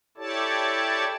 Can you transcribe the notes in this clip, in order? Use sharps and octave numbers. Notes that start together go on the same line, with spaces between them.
E4 G4 A4 C#5 D5 A5